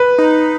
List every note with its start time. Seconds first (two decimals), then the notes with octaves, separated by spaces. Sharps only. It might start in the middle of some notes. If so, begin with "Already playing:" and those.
Already playing: B4
0.18 D#4